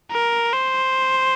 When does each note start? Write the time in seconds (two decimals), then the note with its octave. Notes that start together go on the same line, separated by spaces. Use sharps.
0.12 A#4
0.53 C5